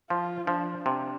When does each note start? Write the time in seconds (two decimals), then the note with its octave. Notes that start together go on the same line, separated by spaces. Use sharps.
0.10 F3 F4
0.47 F3 D4
0.85 C3 D4